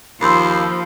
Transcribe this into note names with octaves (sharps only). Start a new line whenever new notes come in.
D#2 F3 B5 C6 E6 G6 C7